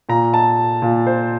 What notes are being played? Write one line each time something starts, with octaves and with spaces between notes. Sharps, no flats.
A#2 A#5
A5
A#2
C5